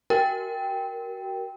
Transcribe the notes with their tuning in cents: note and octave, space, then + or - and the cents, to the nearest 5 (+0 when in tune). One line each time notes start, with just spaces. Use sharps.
F#4 +30 A#4 +5 G5 +0